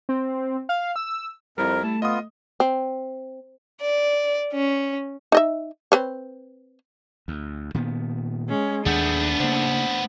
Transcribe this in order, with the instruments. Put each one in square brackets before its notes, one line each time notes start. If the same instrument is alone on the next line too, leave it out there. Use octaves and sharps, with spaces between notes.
[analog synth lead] C4
F5
E6
[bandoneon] F2 A#4 [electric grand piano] G3 E4 [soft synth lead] C5
[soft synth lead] A3 [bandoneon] A5
[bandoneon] B3 F4 [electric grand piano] D#5 D#6
[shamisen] C4
[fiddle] D5
C#4
[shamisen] D#4 D#5 E5
C4 B4 C#5
[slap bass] D2
A#2 D#3 B3
[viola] G#3 C#4
[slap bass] D#2 [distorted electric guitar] A3 B3 [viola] D4 [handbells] G#4 F#5 G6
[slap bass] C#3 A#3 [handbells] C5 F#5